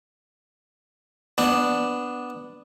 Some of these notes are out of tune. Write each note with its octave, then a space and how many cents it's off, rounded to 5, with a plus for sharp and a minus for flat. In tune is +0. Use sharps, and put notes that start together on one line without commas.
B3 +0 D4 +0